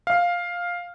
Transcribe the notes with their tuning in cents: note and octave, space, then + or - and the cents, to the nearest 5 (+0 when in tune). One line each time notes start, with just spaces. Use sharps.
F5 +5